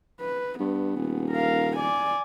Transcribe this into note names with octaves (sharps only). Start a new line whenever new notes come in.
B4
G2 B3
D#1
A#4 F5
D5 G#5